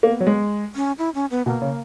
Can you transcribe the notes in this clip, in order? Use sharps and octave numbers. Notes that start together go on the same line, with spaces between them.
A#3 B3
F#3
G#3
C#4
E4
C#4
B3
B2 A#3
C#3